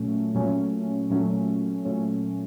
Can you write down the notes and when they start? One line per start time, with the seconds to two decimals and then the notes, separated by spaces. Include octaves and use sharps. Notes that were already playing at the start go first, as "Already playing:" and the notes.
Already playing: A#2 F#3 A3 C#4
0.35 A#2 F#3 A3 C#4
1.10 A#2 F#3 A3 C#4
1.85 A#2 F#3 A3 C#4